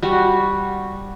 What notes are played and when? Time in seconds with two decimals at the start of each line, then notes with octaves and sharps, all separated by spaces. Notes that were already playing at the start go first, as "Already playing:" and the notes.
0.02 G3 F#4